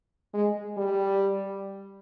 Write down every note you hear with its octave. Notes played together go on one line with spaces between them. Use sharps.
G#3
G3